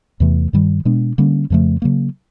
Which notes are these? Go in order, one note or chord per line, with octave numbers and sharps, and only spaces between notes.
E2 C3 E3 A3
G2 D#3 G3
B2 G#3 B3 D4
D3 G3 A#3 C#4
F2 C#3 F3 A3
C#3 F#3 A#3